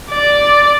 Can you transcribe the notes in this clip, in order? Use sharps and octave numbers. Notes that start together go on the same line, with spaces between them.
D5